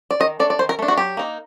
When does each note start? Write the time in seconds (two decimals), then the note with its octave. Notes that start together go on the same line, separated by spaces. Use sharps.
0.11 D5
0.20 D#3 D#5
0.39 A3 D4 D5
0.50 D5
0.59 D#3 C5
0.69 A#4
0.79 A3 D4
0.88 F#4
0.98 F#3 G4
1.17 A#3 D#4